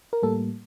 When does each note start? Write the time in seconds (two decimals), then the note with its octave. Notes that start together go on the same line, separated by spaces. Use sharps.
0.13 A#4
0.23 A2 G3 A#3 A4